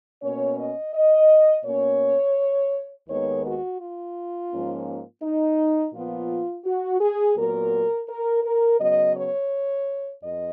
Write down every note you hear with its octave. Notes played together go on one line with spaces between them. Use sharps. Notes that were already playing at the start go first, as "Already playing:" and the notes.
B2 A#3 C#4 C#5
D#5
D#5
B2 A#3 C#4 C#5
D#2 D#3 G#3 B3 C#5
F#4
F4
G#2 F3 A#3 C#4
D#4
A#2 F3 B3 F4
F#4
G#4
A#2 F#3 B3 A#4
A#4
A#4
C#3 F#3 B3 D#5
C#5
F2 D#5